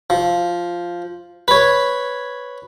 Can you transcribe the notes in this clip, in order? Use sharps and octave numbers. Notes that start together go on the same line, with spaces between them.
F3
B4 C#5